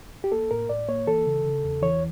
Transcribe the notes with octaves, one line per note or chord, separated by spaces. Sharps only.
G4
A#3 A4
A2 A#4
A2 D5
A#3 C#5
E3 A4
C#3
C#3
E2
E3 C#5